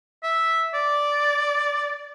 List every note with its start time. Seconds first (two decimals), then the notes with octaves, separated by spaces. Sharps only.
0.23 E5
0.74 D5